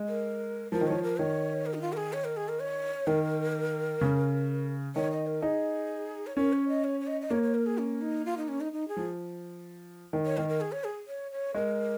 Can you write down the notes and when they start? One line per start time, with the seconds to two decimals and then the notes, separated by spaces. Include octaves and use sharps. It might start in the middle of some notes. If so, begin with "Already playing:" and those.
Already playing: G#3
0.09 A#4
0.72 F3 A#4
0.81 D#3
0.87 F3 C#5
1.03 A#4
1.19 D#3 C#5
1.66 A#4
1.74 D#4
1.82 F4
1.93 A#4
1.97 G#4
2.13 C#5
2.25 A#4
2.37 G#4
2.49 A#4
2.60 C#5
3.07 D#3 A#4
4.01 C#3
4.96 D#3 C#5
5.11 D#5
5.27 A#4
5.42 D#4 G#4
6.27 C#5
6.37 C#4 A#4
6.53 C#5
6.68 D#5
6.84 C#5
7.01 C#5
7.07 D#5
7.21 D#5
7.30 A#3 C#5
7.43 C#5
7.55 A#4
7.66 G#4
7.78 C#4
8.02 D#4
8.25 F4
8.37 D#4
8.49 C#4
8.61 D#4
8.73 D#4
8.88 G#4
8.97 F3
10.13 D#3
10.26 C#5
10.37 D#3 A#4
10.49 A#4
10.61 G#4
10.72 C#5
10.84 G#4
11.08 C#5
11.32 C#5
11.55 G#3 A#4